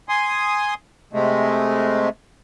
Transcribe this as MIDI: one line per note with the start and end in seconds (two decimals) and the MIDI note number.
0.09 0.74 80
0.09 0.74 84
0.09 0.74 87
1.13 2.09 48
1.13 2.09 56
1.13 2.09 57